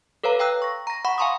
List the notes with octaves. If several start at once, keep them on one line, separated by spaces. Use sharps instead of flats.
A4 B4 C#5 F5 A#5
F5 G5 A#5 E6 F#6
C#6 A#6
A#5 A#6
F#5 B5 C#6
F5 G#5 A#5 C6 C#6 D#6